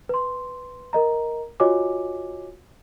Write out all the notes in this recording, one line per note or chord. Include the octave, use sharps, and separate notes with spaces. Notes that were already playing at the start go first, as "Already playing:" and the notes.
B4 C6
A#4 D#5 A#5
F4 F#4 C#5 D#5 G#5 D6